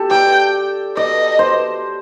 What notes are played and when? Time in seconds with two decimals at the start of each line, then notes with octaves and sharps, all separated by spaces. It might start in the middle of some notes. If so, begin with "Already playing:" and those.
Already playing: G4 A4
0.10 D5 G5
0.97 D5 D#5
1.39 C5